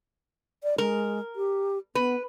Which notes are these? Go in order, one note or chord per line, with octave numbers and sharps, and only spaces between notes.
D5
G#3 A#4
G4
B3 B4